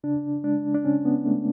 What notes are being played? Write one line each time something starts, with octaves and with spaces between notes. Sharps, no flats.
C#3 D4
G#3 D4
D4
C#3 C#4
B3
G#3 A3